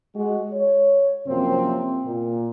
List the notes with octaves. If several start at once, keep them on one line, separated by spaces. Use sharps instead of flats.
G#3 F#4
C#5
F#2 C3 F3 A#3 C4
A#2